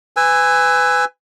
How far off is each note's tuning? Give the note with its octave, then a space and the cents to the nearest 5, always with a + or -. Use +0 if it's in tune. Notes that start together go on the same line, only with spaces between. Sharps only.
B4 +25 G#5 -10 E6 +0